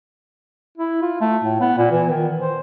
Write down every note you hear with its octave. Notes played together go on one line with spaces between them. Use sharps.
E4
F4
A3
A2
B3
A#2
E3
D#3
C5